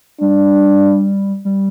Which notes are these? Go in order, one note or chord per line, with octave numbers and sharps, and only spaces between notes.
G3 D4
G3